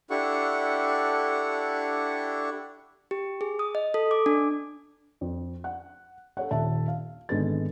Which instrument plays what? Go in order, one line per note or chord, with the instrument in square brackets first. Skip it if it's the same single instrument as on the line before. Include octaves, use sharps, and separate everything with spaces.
[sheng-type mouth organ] D4 E4 G4 A4 F#5 C#6
[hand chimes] G4
G#4
D#6
D#5
A4
D6
D4
[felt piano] F2
F#5
A4 C#5 F#5
D#1 E5 A5
F5
G#1 D3 G#3 B3 A4 A6